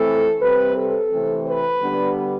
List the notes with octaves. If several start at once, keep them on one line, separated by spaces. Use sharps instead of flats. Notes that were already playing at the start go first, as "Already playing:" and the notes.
Already playing: E3 A3 C4 A4
C3 G3 C4 B4
A4
C3 E3 A3 C4
B4
D3 G3 B3 D4